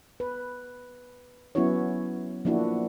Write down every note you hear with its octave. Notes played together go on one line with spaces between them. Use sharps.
B4
F#3 B3 C#4 E4 F#4 C#5
F3 A#3 D4 E4 F#4